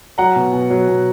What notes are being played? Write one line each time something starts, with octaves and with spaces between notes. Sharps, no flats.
F#3 F#5 A#5
B2
B2
F#3
B2